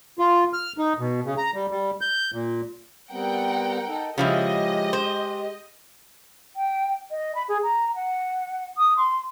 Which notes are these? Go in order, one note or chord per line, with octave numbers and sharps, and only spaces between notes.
F4
F6
D#4
B2
C#3
A#5
G3
G3
G6
A#2
G3 B3 C4 A#4 F#5 G5
D#4 A4
C#3 F3 G#3 E4 G4 D#5
C5
G5
D#5
B5
G#4
A#5
F#5
D#6
C6